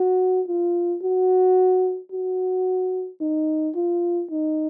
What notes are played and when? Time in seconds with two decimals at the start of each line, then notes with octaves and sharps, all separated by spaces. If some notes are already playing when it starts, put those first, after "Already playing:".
Already playing: F#4
0.48 F4
1.02 F#4
2.12 F#4
3.21 D#4
3.76 F4
4.30 D#4